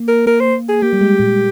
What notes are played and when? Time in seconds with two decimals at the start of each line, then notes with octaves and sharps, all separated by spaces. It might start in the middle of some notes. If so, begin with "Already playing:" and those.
Already playing: A#3
0.08 A#4
0.26 A#3 A#4
0.41 C5
0.69 G#4
0.82 A#3 G4
0.93 G3
1.01 G#3
1.20 A#2